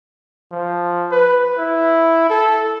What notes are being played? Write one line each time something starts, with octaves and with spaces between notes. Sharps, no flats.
F3
B4
E4
A4